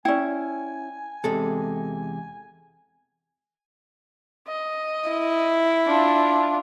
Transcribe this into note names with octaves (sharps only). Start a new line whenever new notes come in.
C#4 E4 D5 G5 G#5
E2 C3 G#3 A4
D#5
E4
D4 F4